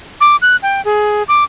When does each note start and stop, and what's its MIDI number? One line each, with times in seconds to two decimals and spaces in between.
0.21 0.36 86
0.42 0.56 90
0.62 0.83 79
0.85 1.23 68
1.28 1.44 86